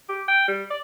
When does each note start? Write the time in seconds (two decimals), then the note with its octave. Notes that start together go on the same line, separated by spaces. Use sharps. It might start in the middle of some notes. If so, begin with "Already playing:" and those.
0.09 G4
0.28 G5
0.48 G3
0.70 D5